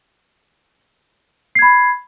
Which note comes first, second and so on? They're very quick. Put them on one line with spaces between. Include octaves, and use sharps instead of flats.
C7 G#6 B5